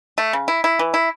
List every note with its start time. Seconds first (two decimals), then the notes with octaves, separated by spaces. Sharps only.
0.18 A3
0.33 C#3
0.48 E4
0.64 E4
0.79 E3
0.94 E4